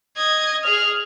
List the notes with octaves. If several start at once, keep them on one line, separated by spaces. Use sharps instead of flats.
D#5 G#6
G#4 F6